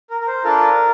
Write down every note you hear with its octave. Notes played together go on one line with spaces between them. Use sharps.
A#4
A#4
C5
D4 F4 A4 A#4